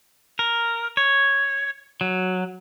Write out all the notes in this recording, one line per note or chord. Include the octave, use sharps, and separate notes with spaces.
A#4
C#5
F#3